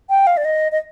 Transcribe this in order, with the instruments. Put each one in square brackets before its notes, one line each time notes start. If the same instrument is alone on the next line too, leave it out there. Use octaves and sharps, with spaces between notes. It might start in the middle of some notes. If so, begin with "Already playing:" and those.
[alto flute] G5
F5
D5
D#5
D#5